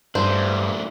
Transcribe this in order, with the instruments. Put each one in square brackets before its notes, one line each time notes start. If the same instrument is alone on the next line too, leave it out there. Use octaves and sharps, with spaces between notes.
[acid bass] G2 [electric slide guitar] E3 A3 D4 [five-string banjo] C5